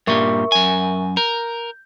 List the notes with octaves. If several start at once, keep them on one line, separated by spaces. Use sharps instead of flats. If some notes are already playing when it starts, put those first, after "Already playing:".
G2 A#2 G3 A#4 E5 C#6
F#2 G#5
A#4 G6